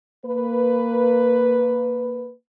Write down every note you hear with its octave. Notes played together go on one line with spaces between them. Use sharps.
A#3 B4